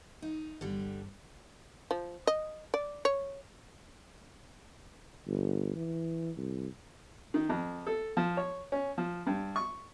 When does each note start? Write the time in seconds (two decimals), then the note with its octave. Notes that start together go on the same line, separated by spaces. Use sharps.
0.22 D#4
0.61 G1 D3 G3
1.91 F3
2.27 D#5
2.74 D5
3.05 C#5
5.27 G1
5.76 E3
6.36 C2
7.34 D#3
7.49 F2
7.87 A4
8.17 F3
8.37 C#5
8.72 C#4
8.98 F3
9.27 G2
9.56 C#6